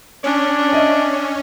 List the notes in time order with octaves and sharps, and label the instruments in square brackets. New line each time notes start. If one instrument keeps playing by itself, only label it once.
[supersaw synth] C#4 [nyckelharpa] D4
[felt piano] D#5 E5